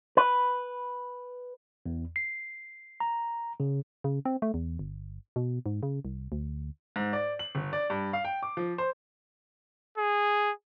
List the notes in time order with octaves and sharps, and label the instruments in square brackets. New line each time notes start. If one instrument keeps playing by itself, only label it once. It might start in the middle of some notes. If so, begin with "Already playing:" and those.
[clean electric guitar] B4
[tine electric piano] E2
C7
A#5
C#3
[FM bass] C#3
C4
A3
E2
G1
B2
G#2
C#3
C2
D2
[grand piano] G#2
D5
F#7
G1
D5
G2
F5
G5
D6
F3
C5
[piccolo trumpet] G#4